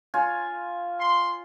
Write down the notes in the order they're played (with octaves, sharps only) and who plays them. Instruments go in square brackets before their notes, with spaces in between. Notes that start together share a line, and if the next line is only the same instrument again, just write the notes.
[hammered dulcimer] F4 C#5 G#5
[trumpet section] C6